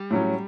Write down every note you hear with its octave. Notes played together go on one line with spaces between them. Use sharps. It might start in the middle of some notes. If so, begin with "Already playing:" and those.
Already playing: G3
A2 F#3 C#4